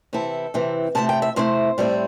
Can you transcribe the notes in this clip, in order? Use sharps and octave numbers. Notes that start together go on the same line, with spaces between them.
C3 E3 C4 E4 A4
C3 E3 C4 E4
C3 A3 C4 E4 A5
G5
E5
C3 A3 C4 E4 C5
A2 G3 C4 E4